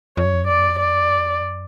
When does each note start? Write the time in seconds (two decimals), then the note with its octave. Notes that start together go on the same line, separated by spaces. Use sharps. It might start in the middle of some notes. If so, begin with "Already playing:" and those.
0.17 F2 C#5
0.25 F#2
0.34 F2
0.43 F#2
0.47 F2 D5
0.59 F#2
0.68 F2
0.76 F#2 D5
0.85 F2
0.93 F#2
1.02 F2
1.10 F#2
1.19 F2
1.41 F#2